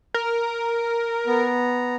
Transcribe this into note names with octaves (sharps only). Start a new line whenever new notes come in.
A#4
B3 A#5